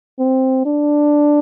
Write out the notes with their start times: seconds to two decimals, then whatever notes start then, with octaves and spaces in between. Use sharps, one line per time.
0.19 C4
0.65 D4